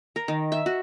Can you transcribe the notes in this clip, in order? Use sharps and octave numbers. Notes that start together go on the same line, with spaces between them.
A#4
D#3
E5
F#4